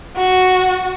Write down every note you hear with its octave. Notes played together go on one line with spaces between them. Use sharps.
F#4